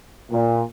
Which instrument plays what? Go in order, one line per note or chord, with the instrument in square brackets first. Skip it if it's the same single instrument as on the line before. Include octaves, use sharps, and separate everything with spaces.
[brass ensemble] A#2